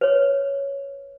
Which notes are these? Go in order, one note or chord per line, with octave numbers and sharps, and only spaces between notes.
B4 C#5